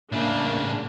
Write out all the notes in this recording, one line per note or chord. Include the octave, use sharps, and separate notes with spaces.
A2 C#3 A#3 D4